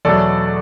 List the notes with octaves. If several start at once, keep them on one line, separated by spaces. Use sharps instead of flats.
E2 B2 F#3 A3 A4 D5